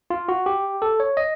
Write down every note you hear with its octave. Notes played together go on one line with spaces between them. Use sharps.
F4
F#4
G4
A4
C#5
D#5